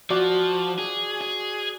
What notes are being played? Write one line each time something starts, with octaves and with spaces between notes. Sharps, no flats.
F3 F#4 D5 D6
G#4
G#4